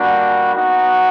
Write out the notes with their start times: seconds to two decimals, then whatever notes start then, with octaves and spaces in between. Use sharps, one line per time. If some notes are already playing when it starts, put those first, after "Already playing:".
Already playing: G3 A#3 D4 F#4
0.55 B3 D#4 F#4